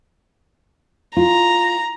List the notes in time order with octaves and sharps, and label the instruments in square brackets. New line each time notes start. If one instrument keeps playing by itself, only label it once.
[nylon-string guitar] F4 [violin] A#5